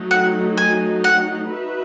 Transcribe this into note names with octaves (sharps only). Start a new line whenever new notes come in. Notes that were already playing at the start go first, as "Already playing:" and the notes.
Already playing: F#3 A3 D#4
F#5
G#5
F#5
D#4 F#4 B4 E5